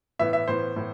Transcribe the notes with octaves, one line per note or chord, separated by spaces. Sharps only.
A2 E3 B3 E5
E5
A2 E3 B3 C5
A2 E3 B3